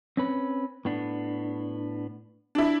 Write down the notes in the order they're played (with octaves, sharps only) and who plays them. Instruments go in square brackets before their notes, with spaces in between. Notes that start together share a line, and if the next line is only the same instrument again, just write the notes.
[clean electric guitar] C4 C#4 B4
A2 B3 D4
[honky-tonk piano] D4 E4